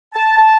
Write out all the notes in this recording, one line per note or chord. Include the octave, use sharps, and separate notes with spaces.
A5
A5